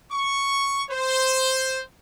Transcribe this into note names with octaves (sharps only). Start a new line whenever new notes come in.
C#6
C5